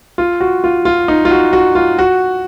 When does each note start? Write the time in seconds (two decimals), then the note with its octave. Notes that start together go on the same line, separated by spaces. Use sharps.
0.18 F4
0.40 F#4
0.64 F4
0.85 F4
1.08 D#4
1.25 F4
1.31 F#4
1.53 F#4
1.75 F4
1.99 F#4